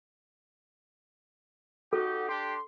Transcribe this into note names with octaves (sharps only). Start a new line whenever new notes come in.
D#4 F#4 G4 A4
D4 G4 C6